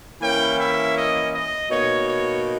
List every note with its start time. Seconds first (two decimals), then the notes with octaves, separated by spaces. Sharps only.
0.21 E3 A#3 C#4 E4 G5
0.59 E5
0.95 D#5
1.33 D#5
1.70 B2 A#3 D#4 C#5
2.07 C#5